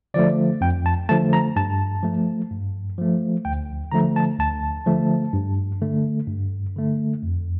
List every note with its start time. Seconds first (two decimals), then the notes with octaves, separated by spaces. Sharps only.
0.14 D3 F3 A3 D5
0.61 F2 G5
0.86 A5
1.09 D3 F3 A3 A5
1.33 A#5
1.56 G2 A5
2.03 F3 A3
2.51 G2
2.98 F3 A3
3.45 D2 G5
3.92 D3 F3 A3 A#5
4.16 A5
4.39 D2 A5
4.86 D3 F3 A3
5.33 G2
5.82 D3 A3
6.28 G2
6.76 D3 A3
7.23 F2